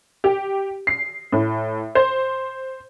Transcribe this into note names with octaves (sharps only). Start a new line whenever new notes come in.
G4
C7
A2
C5